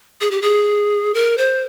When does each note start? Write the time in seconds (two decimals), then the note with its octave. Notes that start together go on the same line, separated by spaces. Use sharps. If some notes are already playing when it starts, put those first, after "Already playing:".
0.21 G#4
0.31 G4
0.42 G#4
1.14 A#4
1.38 C5